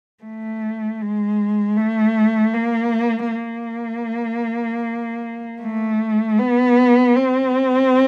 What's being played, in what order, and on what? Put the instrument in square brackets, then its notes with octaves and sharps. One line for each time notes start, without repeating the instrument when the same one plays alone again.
[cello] A3
G#3
A3
A#3
A#3
A3
B3
C4